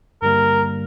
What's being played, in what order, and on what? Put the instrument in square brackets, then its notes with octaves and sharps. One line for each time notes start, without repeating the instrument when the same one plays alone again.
[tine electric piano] G2 D3 G3 A#3 [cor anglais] A#4